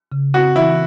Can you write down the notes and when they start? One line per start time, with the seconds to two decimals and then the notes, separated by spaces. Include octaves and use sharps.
0.12 C#3
0.34 C4 F#4
0.55 E3 E4